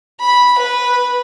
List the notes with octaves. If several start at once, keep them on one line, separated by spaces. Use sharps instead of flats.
B5
B4